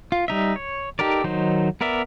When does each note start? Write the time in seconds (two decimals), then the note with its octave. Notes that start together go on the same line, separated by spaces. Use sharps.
0.12 F4
0.28 G3 D#4 E5
0.56 C#5
0.99 D#4 G4 A4 A#4 D5
1.24 D#3 F#3 D#4 C5
1.81 B3 A#4 D5 E5